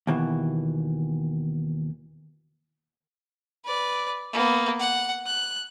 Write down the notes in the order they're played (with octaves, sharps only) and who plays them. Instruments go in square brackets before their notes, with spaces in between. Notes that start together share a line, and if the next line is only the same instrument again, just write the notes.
[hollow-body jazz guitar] D#2 B2 E3
[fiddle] B4 D5
A#3 B3
F#5
F#6